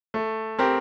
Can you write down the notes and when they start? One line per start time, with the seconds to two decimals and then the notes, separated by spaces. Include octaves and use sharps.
0.14 A3
0.59 C4 G4 A#4